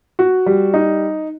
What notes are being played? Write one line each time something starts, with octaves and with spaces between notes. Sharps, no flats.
F#4
G3
D#4